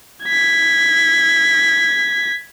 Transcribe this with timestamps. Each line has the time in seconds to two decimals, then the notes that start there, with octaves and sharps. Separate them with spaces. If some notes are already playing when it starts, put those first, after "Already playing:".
0.24 G#6 B6